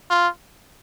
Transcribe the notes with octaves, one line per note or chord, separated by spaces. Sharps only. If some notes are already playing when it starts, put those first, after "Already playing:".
F4